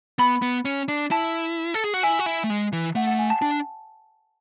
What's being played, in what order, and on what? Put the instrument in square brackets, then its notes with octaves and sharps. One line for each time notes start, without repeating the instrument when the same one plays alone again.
[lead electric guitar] B3 [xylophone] B5
[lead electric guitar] B3
C#4
D4
[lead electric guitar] E4 [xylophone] A5
[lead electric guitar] A4
G#4
F#4
[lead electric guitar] E4 [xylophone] G#5
[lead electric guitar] F#4
E4
A3
G#3
E3
[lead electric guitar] A3 [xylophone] F#5
[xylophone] F#5
G#5
A5
[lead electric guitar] D4 [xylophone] A5